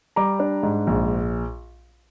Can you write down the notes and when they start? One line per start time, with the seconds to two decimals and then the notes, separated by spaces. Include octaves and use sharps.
0.16 G3 A#5 D6
0.40 D4
0.63 G#2
0.87 A#1